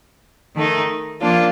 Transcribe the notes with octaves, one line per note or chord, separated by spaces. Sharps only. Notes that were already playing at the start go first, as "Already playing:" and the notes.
D#3 A3 D#4
F3 A#3 D4 F4